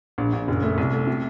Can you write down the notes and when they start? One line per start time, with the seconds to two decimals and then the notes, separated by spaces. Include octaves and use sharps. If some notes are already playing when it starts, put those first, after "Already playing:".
0.18 A#1
0.33 A#1
0.48 F#1
0.63 A3
0.78 C2
0.93 A3
1.07 C3